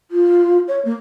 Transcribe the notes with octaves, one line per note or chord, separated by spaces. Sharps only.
F4
C#5
A#3